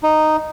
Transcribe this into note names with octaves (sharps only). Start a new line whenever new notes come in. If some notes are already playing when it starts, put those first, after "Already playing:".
D#4